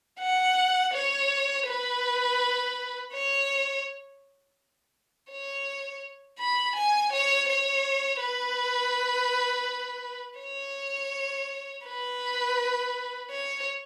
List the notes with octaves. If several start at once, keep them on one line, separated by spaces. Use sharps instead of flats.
F#5
C#5
B4
C#5
C#5
B5
G#5
C#5
C#5
B4
C#5
B4
C#5